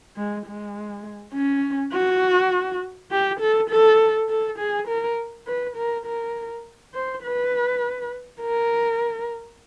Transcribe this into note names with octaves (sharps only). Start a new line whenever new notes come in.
G#3
G#3
C#4
F#4
G4
A4
A4
A4
G#4
A#4
B4
A#4
A#4
C5
B4
A#4